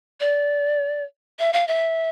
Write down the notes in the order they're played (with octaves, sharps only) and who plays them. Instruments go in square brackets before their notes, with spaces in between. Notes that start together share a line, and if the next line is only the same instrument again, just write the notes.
[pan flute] D5
E5
F5
E5